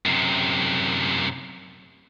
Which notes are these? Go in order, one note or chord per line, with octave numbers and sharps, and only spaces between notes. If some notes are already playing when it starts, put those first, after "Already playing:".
F#2 C3